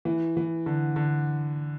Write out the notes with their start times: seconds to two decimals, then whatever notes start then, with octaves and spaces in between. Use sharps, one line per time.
0.05 E3
0.37 E3
0.66 D3
0.96 D3